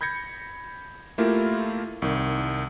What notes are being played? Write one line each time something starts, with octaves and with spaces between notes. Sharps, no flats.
B5 G6 G#6 A#6 C#7
A3 A#3 E4 F4 G4 A#4
C2 D#3